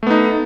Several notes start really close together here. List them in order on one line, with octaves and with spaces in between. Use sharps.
A3 B3 D#4